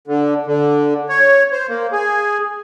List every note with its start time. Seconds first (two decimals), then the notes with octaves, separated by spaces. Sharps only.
0.08 D3
0.46 D3
1.09 C#5
1.52 C5
1.69 A#3
1.92 G#4